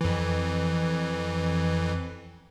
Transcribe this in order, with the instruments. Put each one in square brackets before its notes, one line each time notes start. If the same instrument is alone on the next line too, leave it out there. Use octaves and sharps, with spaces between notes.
[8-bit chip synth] F2 E3